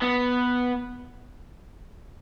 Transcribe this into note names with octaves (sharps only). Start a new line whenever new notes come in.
B3